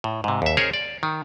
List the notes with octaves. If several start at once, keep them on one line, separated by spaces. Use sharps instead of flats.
A2
G#2 C3
D#2 E5
C#4 G#4 A#4 C5 C#5
D5
D#3